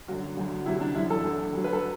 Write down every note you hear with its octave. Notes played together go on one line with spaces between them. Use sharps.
F#2 D3 F#3 F#4
D2 D3 F#3
D2 C3 F#3 E4
D4
F#2 E3 E4
A4
D2 D3 F#3
D2 D3 F#3
B4
A4